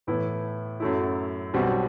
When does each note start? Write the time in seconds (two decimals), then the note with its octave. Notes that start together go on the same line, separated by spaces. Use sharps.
0.07 A2 E3 B3 E4
0.80 F#2 F#3 A3 E4
1.54 B1 B2 G3 C4 F#4